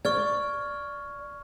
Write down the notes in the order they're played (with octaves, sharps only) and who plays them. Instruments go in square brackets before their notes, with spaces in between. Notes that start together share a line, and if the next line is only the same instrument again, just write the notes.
[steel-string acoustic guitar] D5 [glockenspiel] C#6 F6 G#6